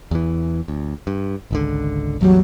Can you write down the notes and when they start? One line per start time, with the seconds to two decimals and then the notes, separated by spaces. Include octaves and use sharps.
0.11 E2 E3
0.68 D2
1.07 G2
1.51 G#1 C#2 D3
2.21 A1 E2 F#3 G3